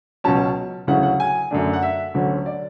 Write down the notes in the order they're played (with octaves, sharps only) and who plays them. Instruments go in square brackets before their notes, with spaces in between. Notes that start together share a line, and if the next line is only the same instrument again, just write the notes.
[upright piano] C#2 B2 F#3 C#4 A5
D2 C#3 F#3 C#4 E4 F#5
F#5
G#5
F#2 D3 A3 D4
F#5
E5
D2 D3 F#3 C#4
D5